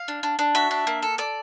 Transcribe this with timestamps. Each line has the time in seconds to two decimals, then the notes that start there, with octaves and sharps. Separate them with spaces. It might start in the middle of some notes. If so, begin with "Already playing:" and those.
Already playing: F5
0.08 D4
0.23 D4
0.39 D4
0.55 F#4 E5
0.71 D4
0.87 A#3
1.02 A4
1.18 A4 D5